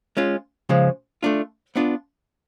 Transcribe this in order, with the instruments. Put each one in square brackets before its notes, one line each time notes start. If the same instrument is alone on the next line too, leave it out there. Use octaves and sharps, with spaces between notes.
[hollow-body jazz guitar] G#3 C#4 F4
C#3 F3 G#3
A3 D4 F4
B3 D4 F4